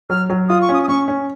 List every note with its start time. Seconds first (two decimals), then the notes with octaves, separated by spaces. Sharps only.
0.10 F#3 F6
0.30 F#3
0.49 F4 D#6
0.61 C#6
0.69 C#4 D#6
0.83 D#6
0.88 C#4 C#6
1.08 C#4